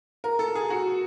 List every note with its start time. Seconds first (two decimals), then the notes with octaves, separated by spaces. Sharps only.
0.24 A#4
0.39 A4
0.55 G#4
0.70 F#4